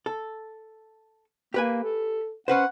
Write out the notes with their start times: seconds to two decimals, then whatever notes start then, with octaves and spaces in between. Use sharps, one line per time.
0.06 A4
1.54 A#3 G4 B4 G#5
1.83 A4
2.48 C#4 B4 C5 F#5